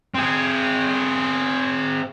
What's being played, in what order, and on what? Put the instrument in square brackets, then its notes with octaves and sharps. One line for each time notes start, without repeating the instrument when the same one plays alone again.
[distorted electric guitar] C4 G#4